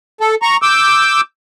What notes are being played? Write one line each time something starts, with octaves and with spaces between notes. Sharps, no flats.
A4
A#5 C#6
D6 E6 G6